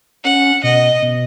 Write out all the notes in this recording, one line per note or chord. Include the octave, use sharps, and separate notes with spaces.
C#4 F#5
B2 D#5
B2